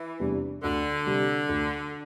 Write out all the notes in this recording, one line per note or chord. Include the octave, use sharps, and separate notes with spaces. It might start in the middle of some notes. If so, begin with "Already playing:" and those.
Already playing: E3
E2 C3 G3 D4
D2 D3
C3 G3
D2